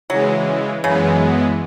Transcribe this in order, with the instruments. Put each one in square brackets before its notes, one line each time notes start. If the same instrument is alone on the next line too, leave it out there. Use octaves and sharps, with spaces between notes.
[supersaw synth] C#3 E3 G#3 [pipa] F#3
[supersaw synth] F#2 E3 G#3 B3 [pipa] C#3